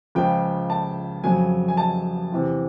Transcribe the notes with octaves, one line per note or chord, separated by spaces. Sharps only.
C#2 C#3 F3 G5
A5
F2 C#3 F#3 G#5
G#5
A5
E2 C3 E3